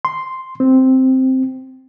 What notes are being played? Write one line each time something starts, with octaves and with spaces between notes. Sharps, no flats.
C6
C4